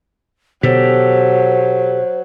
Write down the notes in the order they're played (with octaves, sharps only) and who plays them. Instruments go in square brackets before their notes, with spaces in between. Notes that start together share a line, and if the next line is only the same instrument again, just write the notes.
[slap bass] B2 D3 B3 [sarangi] F#3 [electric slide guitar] G4 A4 [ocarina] C5